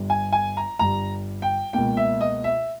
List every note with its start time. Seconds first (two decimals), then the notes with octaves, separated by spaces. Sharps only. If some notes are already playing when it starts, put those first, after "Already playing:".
Already playing: G1 G2 G3
0.10 G#5
0.33 G#5
0.57 A#5
0.79 G1 G2 G3 A#5
1.42 G5
1.73 C#2 B2 A#3 G5
1.97 E5
2.21 D#5
2.44 E5